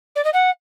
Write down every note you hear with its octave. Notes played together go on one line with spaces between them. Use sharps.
D5
D#5
F#5